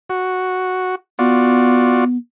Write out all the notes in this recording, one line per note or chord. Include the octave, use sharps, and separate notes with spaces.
F#4
B3 F4 F#4 D5